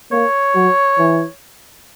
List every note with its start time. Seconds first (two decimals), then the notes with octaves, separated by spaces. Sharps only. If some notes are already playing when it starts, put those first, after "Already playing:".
0.12 A#3 C#5
0.55 F#3
0.98 E3